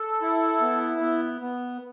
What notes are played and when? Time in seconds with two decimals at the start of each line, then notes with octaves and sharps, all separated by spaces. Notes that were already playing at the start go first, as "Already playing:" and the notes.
Already playing: A4
0.21 E4
0.61 B3
1.01 B3
1.41 B3